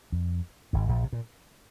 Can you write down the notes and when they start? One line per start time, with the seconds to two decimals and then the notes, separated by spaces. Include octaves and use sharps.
0.12 F2
0.73 G#1 G#2
0.88 A#1 A#2
1.04 C3
1.13 A#2